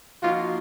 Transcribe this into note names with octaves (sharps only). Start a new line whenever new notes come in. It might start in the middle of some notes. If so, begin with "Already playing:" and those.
F3 A#3 D#4 F4 F#4